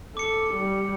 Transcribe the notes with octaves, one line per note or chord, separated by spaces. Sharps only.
A4 D6 C#7
G3